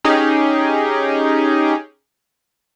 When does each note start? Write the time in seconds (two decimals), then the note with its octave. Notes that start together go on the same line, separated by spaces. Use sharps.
0.04 C#4 D#4 G4 G#4